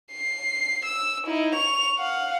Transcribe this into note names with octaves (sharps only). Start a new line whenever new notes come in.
C7
E6
D#4 E4
C#6 F7
F5 F#5